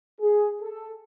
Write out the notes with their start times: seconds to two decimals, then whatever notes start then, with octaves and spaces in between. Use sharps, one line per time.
0.21 G#4
0.62 A4